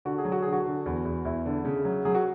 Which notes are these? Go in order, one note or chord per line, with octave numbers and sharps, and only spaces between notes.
D3 F#4
G#4
F#3
F#4
D3 G#4
F#4
D3
E2
E2
E2 E4
D3
C#3
F#3
F#3 G#4
F#4